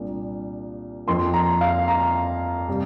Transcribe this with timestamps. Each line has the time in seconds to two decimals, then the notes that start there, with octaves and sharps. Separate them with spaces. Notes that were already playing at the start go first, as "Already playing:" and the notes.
Already playing: C2 A#2 A#3 D4
1.07 F2 F3 A#3 C6
1.34 A#5
1.61 F5
1.88 A#5
2.68 C3 G3